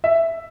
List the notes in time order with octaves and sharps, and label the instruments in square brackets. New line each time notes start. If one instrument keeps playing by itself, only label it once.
[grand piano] E5